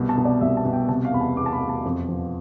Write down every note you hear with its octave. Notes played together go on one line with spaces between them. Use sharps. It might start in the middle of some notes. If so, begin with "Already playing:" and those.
Already playing: C2 B2
A5
B2
D5
C2 E5
A5
B2
G5
C3 A5
F5
E2 B5
A5
E2 D6
A5
B5
E2
A5
F2
F3